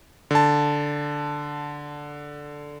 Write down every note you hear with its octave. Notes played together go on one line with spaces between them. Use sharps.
D3 A5